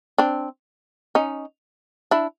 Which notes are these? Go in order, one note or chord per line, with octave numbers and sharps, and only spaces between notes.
C4 D4
C#4 D#4
D4 E4